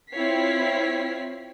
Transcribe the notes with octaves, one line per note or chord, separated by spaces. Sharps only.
C4 E4 F4 C#5 B6 C7